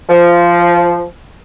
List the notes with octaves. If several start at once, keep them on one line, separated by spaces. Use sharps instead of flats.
F3